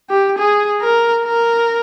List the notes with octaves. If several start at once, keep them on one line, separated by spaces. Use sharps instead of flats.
G4
G#4
A#4
A#4